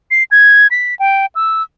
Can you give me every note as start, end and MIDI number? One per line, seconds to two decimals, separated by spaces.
0.11 0.23 96
0.31 0.67 92
0.71 0.95 95
0.99 1.26 79
1.35 1.63 88